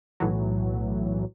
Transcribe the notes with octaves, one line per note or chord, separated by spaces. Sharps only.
B1 A2 E3 F#3